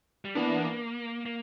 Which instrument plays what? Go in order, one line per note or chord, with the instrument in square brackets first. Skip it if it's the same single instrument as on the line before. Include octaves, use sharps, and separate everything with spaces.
[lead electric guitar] G3
[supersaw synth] E3 B3 D4 [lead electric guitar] A#3
[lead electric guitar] A#3